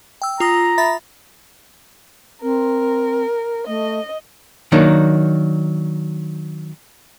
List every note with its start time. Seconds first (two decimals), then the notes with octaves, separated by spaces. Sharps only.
0.22 G5 E6
0.40 F4 A#5 D#6
0.78 E5 B5 A6
2.42 C4 A#4
3.66 A3 D#5
4.72 D#3 F#3 A#3 D4 D#4